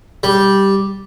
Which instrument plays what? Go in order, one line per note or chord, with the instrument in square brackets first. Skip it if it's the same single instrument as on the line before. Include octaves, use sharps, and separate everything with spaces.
[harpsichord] G3